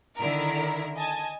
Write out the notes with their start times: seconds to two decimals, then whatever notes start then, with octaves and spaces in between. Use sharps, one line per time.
0.17 D3 D#3 E4 A#4
0.96 D#5 G#5 A5